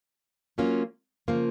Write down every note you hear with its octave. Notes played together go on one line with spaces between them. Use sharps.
F#3 A#3 C#4 F4
C#3 F3 A#3 F4